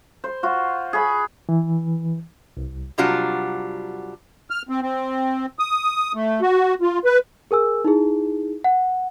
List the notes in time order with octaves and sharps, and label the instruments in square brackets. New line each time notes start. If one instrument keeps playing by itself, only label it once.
[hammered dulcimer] C5
F4 F#4
G#4 B5
[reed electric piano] E3
C2
[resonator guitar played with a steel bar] C3 F#3 G3 D4 F4 F#4
[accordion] F6
C4
C4
D#6
A3
F#4
F4
B4
[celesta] G#4 A#4 G#5 E6
D#4 E4 G#4
F#5